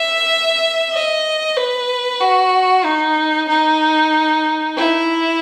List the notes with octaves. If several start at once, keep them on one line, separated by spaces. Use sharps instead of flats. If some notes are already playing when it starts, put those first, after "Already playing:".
Already playing: E5
D#5
B4
F#4
D#4
D#4
E4